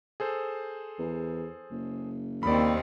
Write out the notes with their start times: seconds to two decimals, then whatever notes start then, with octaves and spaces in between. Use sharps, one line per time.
0.20 G#4 A4 C5
0.99 E2
1.71 F#1
2.43 D#2 D#3 C4 D5 B5